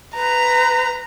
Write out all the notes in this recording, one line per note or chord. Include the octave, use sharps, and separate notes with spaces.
B4 A#5